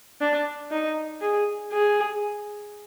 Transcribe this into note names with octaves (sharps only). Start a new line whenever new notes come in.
D4
D#4
G#4
G#4